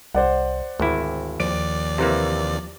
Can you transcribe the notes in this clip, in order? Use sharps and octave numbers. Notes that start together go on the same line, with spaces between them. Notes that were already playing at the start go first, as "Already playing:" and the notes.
C2 C5 D5 F#5
G#1 D2 E4
D#2 F3 D5 D7
C3 E3 A#3